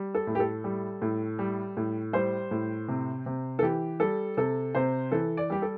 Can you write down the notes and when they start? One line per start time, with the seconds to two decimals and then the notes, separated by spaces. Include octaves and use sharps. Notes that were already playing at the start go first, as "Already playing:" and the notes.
Already playing: G3
0.15 A4
0.27 A2
0.35 G4
0.40 A4
0.64 G3
1.02 A2
1.39 G3
1.77 A2
2.13 G3 C5
2.51 A2
2.88 C3
3.26 C3
3.59 A4
3.62 E3 G4
4.00 G3 A4
4.37 C3 A4
4.75 C3 C5
5.12 E3 A4
5.37 D5
5.50 G3 G4
5.62 A4